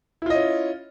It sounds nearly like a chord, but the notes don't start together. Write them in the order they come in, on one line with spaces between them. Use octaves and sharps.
E4 F4 D#5 C#4